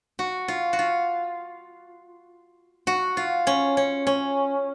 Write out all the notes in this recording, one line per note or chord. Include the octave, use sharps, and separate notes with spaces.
F#4
F4
F#4
F4
F#4
F4
C#4
C#4
C#4